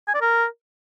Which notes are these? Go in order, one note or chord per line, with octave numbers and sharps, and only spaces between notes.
G#5
D5
A#4